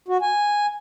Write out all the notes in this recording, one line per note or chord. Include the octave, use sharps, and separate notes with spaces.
F#4
G#5